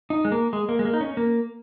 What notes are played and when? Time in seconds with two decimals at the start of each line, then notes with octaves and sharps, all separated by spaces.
0.10 D#4
0.25 G#3
0.32 A#3
0.53 G#3
0.69 A#3
0.79 G#3
0.85 A#3
0.94 D#4
1.01 C#4
1.17 A#3